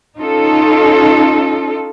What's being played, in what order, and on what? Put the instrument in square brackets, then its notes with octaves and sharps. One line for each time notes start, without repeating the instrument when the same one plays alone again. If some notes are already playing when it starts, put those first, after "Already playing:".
[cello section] C#4 D#4 F4 A4